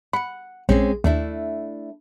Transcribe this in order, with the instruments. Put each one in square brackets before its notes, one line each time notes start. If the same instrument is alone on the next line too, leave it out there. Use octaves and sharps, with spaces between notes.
[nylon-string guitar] F#5 [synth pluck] B5 C#7
[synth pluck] A#1 C7 [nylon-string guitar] G#3 C4 C#4
[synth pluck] D#2 [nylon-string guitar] A3 D4 E4